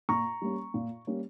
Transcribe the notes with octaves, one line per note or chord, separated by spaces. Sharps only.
A#2 A#5 C#6
G3 A#3 C#4
A#2
G3 A#3 C#4